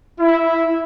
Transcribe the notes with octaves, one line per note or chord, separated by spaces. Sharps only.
E4